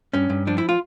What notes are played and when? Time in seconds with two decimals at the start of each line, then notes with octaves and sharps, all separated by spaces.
0.13 G2 C#4
0.30 G2
0.47 F3 D4
0.58 E4
0.69 F4